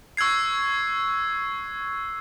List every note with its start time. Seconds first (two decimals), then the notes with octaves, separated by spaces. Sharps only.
0.17 C#6 E6 F#6 G#6 C7